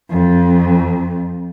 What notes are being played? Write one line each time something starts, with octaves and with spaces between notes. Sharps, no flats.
F2